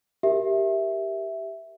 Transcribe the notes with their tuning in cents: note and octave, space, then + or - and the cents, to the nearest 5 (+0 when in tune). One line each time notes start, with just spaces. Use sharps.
G4 +0 A#4 +0 E5 +0